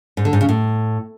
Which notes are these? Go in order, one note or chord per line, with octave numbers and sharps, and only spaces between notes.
G#2
D3
G#2
C#3
A2